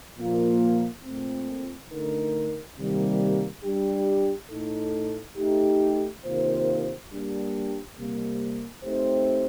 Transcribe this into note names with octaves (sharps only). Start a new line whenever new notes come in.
A#2 F3 A#3 F4
A#2 A3 C4
D3 A3 D#4 A#4
C3 D#3 G3 A#3
G3 D4 G4
A2 A3 D#4 A4
A3 D#4 G4
C3 D#3 A#3 F4 C5
G3 A#3 D4 G4
C3 G3 A#3
A3 C4 D#4 G4 C5